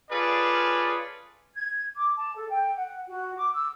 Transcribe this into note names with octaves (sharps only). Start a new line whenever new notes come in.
C#4 F4 G#4 A4 B4 D5
G#6
D6
A5
A4
G5
F#5
F#4
D6
E6